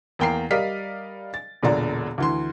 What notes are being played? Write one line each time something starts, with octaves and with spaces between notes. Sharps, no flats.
E2 A#3 G5 A#5 C7
G3 A#4 D5 D#5 F5 B6
A6
E1 A#2 D3 D5 A#5
D2 E3 C6